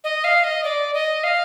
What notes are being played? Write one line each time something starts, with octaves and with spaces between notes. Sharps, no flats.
D#5
F5
D#5
D5
D#5
F5